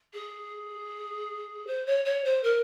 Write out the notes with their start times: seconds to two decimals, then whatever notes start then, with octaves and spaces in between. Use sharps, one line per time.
0.13 G#4
1.67 C5
1.86 C#5
2.05 C#5
2.24 C5
2.43 A#4